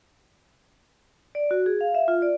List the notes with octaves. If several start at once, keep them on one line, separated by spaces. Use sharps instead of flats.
D5
F#4
G#4
F5
E5
F4
D5